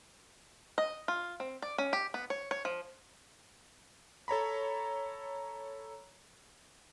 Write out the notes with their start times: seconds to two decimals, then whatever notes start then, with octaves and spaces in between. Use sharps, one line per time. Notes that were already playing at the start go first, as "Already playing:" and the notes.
0.78 D#5
1.08 F4
1.40 C4
1.62 D5
1.78 C#4
1.93 G4
2.14 B3
2.30 C#5
2.51 C#5
2.65 F3
4.28 A4 C#5 A#5 B5